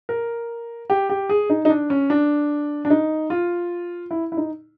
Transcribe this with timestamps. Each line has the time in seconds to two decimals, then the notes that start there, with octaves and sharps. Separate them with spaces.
0.09 A#4
0.90 G4
1.10 G4
1.29 G#4
1.50 D#4
1.65 D#4
1.70 D4
1.90 C#4
2.10 D4
2.85 D4
2.90 D#4
3.30 F4
4.11 E4
4.32 E4
4.37 D#4